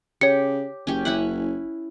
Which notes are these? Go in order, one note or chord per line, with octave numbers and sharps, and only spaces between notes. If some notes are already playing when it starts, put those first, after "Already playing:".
C#3 G4 C#5 C#7
F#1 C#4 G4
C#4 E4 F#5